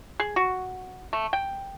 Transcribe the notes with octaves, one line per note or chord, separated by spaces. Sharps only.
G#4
F#4
A3
G5